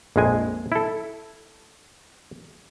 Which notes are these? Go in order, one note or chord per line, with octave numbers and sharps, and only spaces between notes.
A#1 F2 G#3 G#5
E4 A4